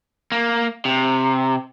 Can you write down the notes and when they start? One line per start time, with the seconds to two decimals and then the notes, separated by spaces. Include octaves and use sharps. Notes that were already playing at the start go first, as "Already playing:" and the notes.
0.32 A#3
0.85 C3